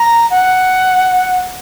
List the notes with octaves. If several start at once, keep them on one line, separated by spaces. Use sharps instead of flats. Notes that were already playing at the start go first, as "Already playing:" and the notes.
Already playing: A#5
F#5